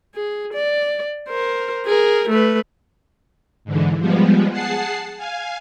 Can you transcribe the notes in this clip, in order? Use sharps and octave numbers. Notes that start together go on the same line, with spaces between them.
G#4
D5
A#4 C5
G#4 A#4
A3 B4
G#2 D3 E3
F3 G3 G#3 B3
G#4 F#5 A5 C7
F5 G#5